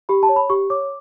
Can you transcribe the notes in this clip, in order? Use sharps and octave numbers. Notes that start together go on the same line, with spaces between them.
G4 B5
A5
C#5
B5
G4 C#6
C#5 D6